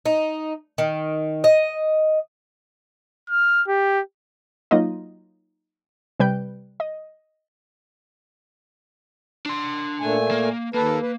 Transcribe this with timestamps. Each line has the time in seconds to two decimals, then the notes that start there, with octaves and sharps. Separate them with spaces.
0.06 D#4
0.78 D#3
1.44 D#5
3.29 F6
3.68 G4
4.71 F#3 A#3 D#4 F4 D#5
6.20 C3 G3 B4 G5 G6
6.80 D#5
9.46 D4 C6
10.01 A#2 A3 G#5
10.31 A#3
10.74 D#2 A#3 A4 B4
11.00 B4